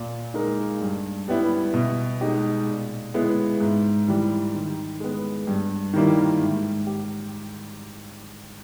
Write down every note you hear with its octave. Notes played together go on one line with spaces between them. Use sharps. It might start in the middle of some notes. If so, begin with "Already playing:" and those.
Already playing: A#2
G#3 D#4 A#4
G2
G3 B3 E4
B2
G#3 D#4 G4
A#2
G#3 B3 E4
G#2
E3 G3
D#3
G#3 B3
G2
D#3 G3 A#3 E4
G#2
G4